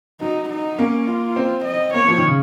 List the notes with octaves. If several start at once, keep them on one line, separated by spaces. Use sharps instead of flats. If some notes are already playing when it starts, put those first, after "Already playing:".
F#3 D#4
D#4
A#3 C#4
F4
C4
D#5
A#3 C#5
F3
D#3
C#3